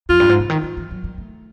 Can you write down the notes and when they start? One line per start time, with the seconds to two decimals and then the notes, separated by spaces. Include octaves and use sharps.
0.09 F2 F4
0.20 G2
0.29 G#2
0.40 C#3
0.50 D#3
0.63 E3
0.77 E3
0.91 F#3
1.04 G3
1.18 A3